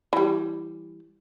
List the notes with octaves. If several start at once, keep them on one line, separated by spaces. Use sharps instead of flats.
E3 G3